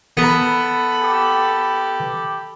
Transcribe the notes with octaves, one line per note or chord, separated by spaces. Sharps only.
B3 A4 B5
G4